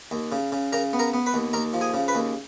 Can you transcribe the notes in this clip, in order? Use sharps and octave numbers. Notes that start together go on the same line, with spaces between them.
D#2
C#3
C#3
C#3 A#4 A#5
B3
A#4 A#5
B3
B4 B5
D#2
D#2 A#4 A#5
F3
G#4 G#5
C#3
B4 B5
D#2